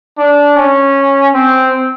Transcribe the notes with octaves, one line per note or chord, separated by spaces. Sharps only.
D4
C#4
C4